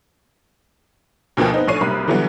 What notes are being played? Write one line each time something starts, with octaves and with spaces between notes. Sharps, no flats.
D2 B2 F3 A#3 G5
B3 C4 D#4
A#1 A2 D4 C#5 C7 D#7
B1 C3 G3 A#3 B5 F#6
D3 E3 F#3 G3 B3